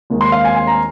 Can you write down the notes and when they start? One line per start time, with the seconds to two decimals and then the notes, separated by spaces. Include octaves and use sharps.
0.10 D#2 D#3 G#3
0.21 C6
0.32 F5
0.44 G#5
0.55 G#5
0.67 A#5